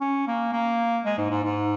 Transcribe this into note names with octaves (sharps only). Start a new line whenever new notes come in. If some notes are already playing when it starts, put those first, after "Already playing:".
C#4
A#3
A#3
G#3
G#2
G#2
G#2